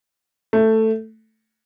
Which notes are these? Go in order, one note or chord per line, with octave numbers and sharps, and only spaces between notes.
A3